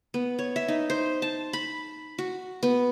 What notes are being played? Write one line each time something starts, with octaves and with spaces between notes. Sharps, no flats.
B3
C#5
E5
D#4
C5
A5
B5
F#4
B3